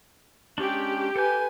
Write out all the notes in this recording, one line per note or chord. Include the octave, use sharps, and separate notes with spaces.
G#3 C#4 D4 G4
A4 B4 G#5 G6